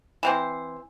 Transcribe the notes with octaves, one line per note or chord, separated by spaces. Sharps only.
E3 C4 C5